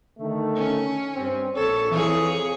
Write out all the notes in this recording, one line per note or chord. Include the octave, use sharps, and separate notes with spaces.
D3 D#3 A3
C#4
G2 C4
A#1 A4 C#5
F2 E3 G#4 C#5